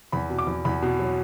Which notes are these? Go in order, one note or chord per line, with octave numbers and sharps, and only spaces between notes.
E2 B5
B2
D6
E2
E2 B5
B2
F#3